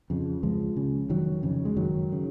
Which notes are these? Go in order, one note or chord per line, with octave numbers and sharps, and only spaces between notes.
F2 C#3
C#2 F3 G#3
C#3
F1 D#3 F#3
F2 C#3
G#3
F#1 D#3 F#3
C#3